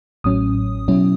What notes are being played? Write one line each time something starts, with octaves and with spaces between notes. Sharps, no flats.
A1 A2 F#3 C#4 D#6
B2 F#3 C#4 E4